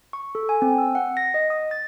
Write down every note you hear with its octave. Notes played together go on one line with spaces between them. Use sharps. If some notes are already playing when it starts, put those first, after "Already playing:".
C#6
A4
G#5
C4
E6
F#5
A#6
D#5
D#6
A6